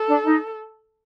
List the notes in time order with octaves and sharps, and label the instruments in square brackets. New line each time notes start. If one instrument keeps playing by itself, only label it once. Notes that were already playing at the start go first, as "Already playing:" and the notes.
Already playing: [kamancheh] A4
[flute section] D4
D#4